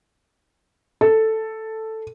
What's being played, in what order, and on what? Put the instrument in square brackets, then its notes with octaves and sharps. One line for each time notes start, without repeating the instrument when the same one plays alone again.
[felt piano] A4